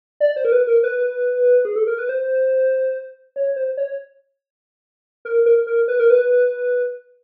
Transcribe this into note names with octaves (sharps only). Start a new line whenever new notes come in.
D5
C5
A#4
B4
A#4
B4
G#4
A4
A#4
B4
C5
C#5
C5
C#5
A#4
A#4
A#4
B4
A#4
B4